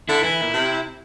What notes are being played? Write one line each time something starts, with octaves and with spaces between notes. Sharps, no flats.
D3 E4
E3 E4
A#2
C3